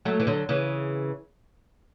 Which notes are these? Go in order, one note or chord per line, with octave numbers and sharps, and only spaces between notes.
F#3 A3
E3
D3 F#3
C#3 E3